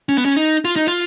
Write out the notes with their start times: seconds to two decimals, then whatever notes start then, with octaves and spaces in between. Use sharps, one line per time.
0.09 C#4
0.18 B3
0.25 C#4
0.37 D#4
0.65 F4
0.76 D#4
0.88 F4